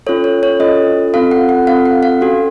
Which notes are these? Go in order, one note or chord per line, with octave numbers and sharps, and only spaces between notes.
C#4 F4 A4 C#5
C#5
C#5
C#4 F4 A4 D#5
C4 F4 A4 F5
F#5
F#5
C4 F4 A4 F5
F#5
F5
C#4 F#4 A4